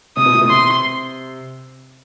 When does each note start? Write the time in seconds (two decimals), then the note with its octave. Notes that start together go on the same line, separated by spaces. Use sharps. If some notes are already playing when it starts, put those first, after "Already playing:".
0.17 C3 D#6
0.26 B2
0.34 A2
0.41 B2
0.49 C3 C6